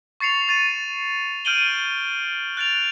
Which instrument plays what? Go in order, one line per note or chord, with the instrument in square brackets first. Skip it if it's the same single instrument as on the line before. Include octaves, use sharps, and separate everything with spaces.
[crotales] C#6 A6 C7 C#7 F7
C#6 A6 D#7
F6 G6 D7 D#7 F#7 G7
F#6 A6 D7 F7